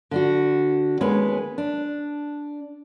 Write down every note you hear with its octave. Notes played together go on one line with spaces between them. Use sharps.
D3 D4 F#4
D#2 G#3 B3 C#4 B4
D4